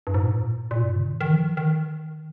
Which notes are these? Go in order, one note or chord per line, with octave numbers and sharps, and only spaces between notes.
G2
G#2
A#2
A#2
G2
C#3
D#3
D#3
F3
D#3